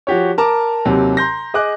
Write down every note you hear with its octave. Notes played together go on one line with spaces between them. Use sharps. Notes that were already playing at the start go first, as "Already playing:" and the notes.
F3 F#4 G4 C#5
A#4 A5 A#5 D6
D#2 C3 F#3
A#5 C6 G6 A#6
G#4 D#5 D6 F#6